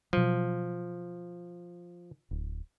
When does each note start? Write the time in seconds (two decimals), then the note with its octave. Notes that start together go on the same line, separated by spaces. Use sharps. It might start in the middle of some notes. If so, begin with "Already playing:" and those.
0.13 B2 F3 F#3
2.31 D1